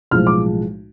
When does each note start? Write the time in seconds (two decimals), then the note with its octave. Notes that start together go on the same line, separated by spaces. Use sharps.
0.11 B1 A2 F3 G#3 F6
0.27 D6